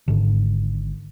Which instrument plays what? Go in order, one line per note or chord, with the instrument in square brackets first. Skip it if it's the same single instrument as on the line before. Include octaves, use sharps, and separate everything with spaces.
[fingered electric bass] G#1 G#2 D3